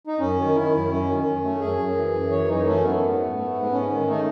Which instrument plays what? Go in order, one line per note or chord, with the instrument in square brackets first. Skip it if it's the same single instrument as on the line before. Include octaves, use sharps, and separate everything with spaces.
[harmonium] D#4
F#2 C#4
D#3
D#3 E4
F#2
F#2 C#4
D#3
F#2
A3
F#2 G#4
F#2
E3
F#2
E3 C#5
F#2 D#4
A3 C#4
F#2 B3
G#2
A3
A3
G#2
G#2 C#4
D#3
A3 D#4